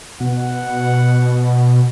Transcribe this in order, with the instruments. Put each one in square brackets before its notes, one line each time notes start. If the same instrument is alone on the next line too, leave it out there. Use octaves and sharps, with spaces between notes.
[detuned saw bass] B2 [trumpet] F#5